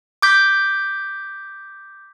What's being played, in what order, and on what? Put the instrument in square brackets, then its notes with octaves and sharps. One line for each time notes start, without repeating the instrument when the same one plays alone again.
[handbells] D6 G6 B6